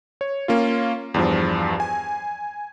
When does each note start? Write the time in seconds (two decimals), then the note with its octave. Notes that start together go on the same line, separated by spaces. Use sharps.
0.21 C#5
0.48 A#3 C#4 F4
1.14 E2 G2 F3
1.80 G#5